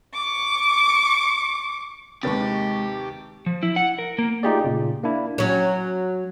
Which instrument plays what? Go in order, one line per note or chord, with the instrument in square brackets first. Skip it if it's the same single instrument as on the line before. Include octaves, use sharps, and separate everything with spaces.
[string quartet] C#6 D6
[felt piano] D#2 B4 A6 [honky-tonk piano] C3 C#6 [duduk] G#3 [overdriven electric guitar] G4
[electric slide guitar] F3
E4
F#5
A#4
A#3
[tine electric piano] A3 D#4 F4 G4 G#4 D5
A#2 C#3
A#3 D4 E4
[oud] F#3 C#4